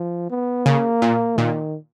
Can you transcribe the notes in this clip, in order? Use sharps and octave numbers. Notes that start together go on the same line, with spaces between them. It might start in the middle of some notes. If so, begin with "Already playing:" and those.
Already playing: F3
B3
C#3 A#3
A#2
A#2 D#3